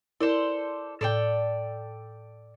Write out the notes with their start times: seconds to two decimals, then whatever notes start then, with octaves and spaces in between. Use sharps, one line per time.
0.21 E4 A4 A#4 C5 D5
1.01 A2 A4 D5 G5